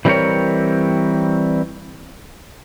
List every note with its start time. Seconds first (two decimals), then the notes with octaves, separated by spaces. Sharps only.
0.05 E3 G3 C4 D#4 A#4 C#5